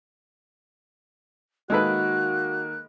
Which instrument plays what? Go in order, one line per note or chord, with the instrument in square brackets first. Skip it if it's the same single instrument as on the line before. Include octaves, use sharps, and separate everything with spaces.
[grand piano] D#3 A#3 [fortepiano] G#3 A4 B4 [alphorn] F#4 [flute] F#6